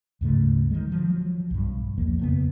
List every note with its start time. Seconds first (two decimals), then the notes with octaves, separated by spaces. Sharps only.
0.21 D2 G#2 C#3 A3
0.71 D#3 F3 G#3
0.92 F3 F#3
1.51 B1 G2
1.98 B1 E2 F3 A#3
2.19 F2 C#3 A3 B3